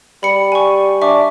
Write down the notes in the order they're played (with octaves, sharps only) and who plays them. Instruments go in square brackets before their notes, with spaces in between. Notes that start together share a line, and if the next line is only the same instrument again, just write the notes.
[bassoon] G3 [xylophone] B5 C#7
[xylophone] G#5 C#6
[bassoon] D4 [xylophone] E5 C#6 D6